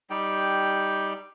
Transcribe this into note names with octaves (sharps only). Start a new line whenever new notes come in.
G3 D#4 G4 G5